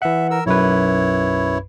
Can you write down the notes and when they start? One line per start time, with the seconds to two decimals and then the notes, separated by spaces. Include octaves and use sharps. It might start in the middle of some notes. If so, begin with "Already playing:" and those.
0.02 E3 E5 F#5
0.31 A#4 E6
0.46 B1 F#2 E4 B4 C#5